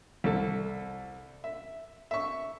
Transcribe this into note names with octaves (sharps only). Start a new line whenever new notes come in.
C2 A4
E5
E5 C#6